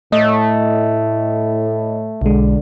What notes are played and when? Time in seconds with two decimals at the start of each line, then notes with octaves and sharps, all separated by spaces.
0.12 A2 A3 D#5
2.22 B1 D3 G#3